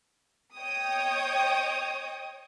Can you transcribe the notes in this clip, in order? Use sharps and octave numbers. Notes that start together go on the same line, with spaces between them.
C#5 D#5 G5 D#6